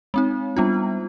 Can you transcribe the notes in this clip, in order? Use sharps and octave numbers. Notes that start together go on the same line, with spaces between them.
G#3 C4 D#4
G3 B3 D4 F4